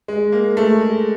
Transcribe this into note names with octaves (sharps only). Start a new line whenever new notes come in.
G#3
A#3
A3
G#3